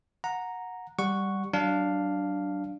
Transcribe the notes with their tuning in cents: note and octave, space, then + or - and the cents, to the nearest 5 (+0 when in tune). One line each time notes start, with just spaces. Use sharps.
F#5 -15 A#5 +0
G3 +0 F#5 +0 C#6 +0
F#3 +35 D4 +0 F5 +0